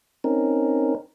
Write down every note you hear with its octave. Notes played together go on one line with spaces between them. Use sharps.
C4 C#4 D#4 A#4